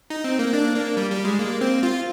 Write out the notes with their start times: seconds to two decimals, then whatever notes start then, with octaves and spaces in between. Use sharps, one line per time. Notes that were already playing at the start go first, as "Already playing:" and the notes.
0.10 D#4
0.24 C4
0.39 A#3
0.53 D4
0.75 A#3
0.97 G3
1.11 G3
1.25 G#3
1.39 A#3
1.61 C4
1.83 F4